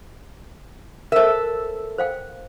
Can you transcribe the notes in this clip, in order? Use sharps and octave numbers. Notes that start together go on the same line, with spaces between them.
A4 A#4 C5 E5
C5 F5 G5